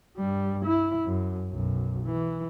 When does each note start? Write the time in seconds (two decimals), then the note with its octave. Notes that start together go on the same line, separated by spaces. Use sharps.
0.17 G2 G3
0.65 E4
1.05 F#2
1.50 B1 F#2
2.05 E3